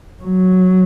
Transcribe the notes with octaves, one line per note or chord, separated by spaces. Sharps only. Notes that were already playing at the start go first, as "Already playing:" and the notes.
F#3